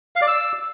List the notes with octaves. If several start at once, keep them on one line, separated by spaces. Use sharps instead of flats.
F5
D5
E6